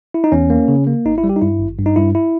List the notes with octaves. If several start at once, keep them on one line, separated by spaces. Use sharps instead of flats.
E4
D#4
E2 C#4
A#3
C#3
A#3
G#1 D#4
E4
G3
G4
D#4
G2 E4
G#1
G2
D#4
G2 E4
E4